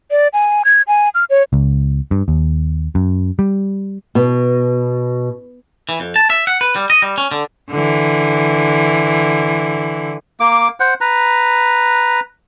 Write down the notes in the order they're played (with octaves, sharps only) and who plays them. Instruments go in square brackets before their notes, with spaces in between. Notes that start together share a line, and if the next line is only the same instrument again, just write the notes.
[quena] D5
G#5
G#6
G#5
F6
C#5
[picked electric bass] C#2
G2
D#2
F#2
G3
[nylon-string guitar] B2
[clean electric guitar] E3
F2
A5
E5
F#5
B4
G3
D#5
G3
C#4
D3
[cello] D3 E3
[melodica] A#3 D6
C5 F#5
B4 A#5